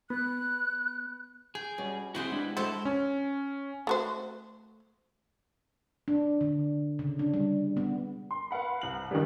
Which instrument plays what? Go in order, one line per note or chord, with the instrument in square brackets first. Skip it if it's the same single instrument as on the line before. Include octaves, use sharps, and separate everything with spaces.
[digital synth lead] B3 [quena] F#6
[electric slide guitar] G#4 [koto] G5
[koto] B2 [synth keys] G3 C#4
[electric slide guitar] C4 E4 F#4 [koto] G#4 C5 F#5 [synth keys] B4
[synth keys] G#3 D4 [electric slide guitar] E4 G4
[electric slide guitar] G#3 F#5 [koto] E4 A4 A5 [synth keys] F#4 [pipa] C5
[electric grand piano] C#4
[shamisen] A3 F#4 C5
[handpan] D4
D3
C#3
D4
G3
B3
[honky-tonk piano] C6
B4 F5 F#5 B5
C2 F#7
D#3 E3 G3